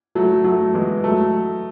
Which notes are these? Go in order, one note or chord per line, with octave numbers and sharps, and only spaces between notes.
F#3 A3
F#3 A3
E3 G#3
F#3 A3